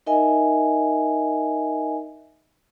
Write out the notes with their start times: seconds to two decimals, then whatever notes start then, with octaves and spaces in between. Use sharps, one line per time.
0.07 D#4 A#4 D#5 E5 G#5